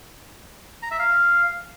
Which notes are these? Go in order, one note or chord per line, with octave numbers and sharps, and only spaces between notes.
A#5
E5
F5